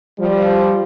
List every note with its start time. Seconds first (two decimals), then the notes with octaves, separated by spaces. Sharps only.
0.18 F3 G3